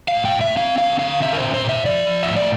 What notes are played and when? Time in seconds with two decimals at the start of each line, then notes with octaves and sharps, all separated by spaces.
0.08 F5
0.13 A2
0.25 G5
0.35 A2
0.41 E5
0.56 C4 F5
0.78 D3 F5
0.99 D3 F5
1.21 C4 E5
1.33 A#4
1.37 C5
1.43 A#2
1.54 C5
1.64 A#2 E5
1.85 F3 D5
2.07 F3
2.23 E5
2.29 A2
2.36 D5